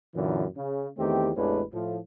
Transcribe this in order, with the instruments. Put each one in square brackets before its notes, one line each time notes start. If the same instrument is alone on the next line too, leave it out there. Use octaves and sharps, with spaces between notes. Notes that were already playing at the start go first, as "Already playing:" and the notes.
[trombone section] F#2 A#2 D3 E3
C#3
E2 D#3 A3 C4 G4
A1 E2 G#3 C#4 D4 B4
A2 F3